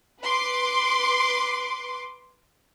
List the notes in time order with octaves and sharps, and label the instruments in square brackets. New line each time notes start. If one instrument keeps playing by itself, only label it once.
[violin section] B4 C6 D6